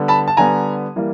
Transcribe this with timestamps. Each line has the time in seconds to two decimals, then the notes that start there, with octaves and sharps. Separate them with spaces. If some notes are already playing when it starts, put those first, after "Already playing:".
Already playing: D3 G3 B3
0.08 A5 B5
0.28 A5
0.37 D3 G3 B3 G#5 A#5
0.96 E3 G3 A#3